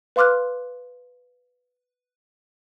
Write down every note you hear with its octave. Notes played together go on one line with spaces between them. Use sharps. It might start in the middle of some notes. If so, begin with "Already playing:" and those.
B4 F5 C6 D6 F6 F#6